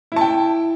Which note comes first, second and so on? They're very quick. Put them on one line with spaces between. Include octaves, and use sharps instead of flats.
E4 A5 G5